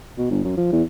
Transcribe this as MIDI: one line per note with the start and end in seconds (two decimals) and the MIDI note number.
0.18 0.27 47
0.31 0.44 31
0.45 0.56 42
0.57 0.70 53
0.72 0.83 40